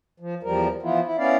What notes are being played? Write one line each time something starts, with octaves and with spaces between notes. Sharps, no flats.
F3
E2 F3 G3 A#4
E3 F3 B3 E4 F4
E4
B3 C#4 E4 D5 F5